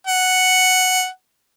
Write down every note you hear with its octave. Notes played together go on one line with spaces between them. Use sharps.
F#5